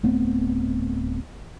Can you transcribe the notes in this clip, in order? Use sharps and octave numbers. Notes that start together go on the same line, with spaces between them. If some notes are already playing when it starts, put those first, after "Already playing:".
D1 A3 B3 C4